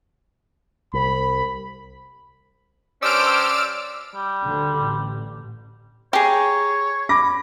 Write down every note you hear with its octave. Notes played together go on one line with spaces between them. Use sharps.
C2 B5
G2 C#4 C5 D5 E6 F6 D7
G3
D2 D3
A1
G4 G#4 C#5 A#5
B5 D6 A#6